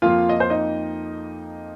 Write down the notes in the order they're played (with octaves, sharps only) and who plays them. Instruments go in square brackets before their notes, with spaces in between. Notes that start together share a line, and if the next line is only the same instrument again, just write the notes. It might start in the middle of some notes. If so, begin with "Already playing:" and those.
[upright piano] F2 F3 A#3 F4 F5
D#5
C5
D#4 D#5